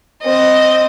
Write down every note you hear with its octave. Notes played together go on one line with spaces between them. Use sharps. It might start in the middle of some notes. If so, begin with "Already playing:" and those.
C4 D#5